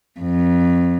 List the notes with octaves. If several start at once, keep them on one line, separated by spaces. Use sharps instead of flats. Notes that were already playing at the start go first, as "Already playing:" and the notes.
F2